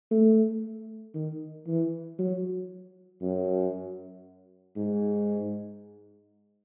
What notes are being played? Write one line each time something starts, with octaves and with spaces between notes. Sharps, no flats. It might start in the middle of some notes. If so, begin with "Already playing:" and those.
A3
D#3
E3
F#3
F#2
G#2